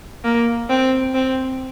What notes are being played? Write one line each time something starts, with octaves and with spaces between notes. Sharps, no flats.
A#3
C4
C4